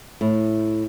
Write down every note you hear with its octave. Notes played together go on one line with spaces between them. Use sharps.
A2